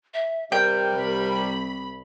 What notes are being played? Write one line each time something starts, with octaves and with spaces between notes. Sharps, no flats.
E5
C3 G3 A#4 G5
C2 B5